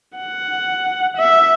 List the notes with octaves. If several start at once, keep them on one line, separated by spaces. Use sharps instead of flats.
F#5
E5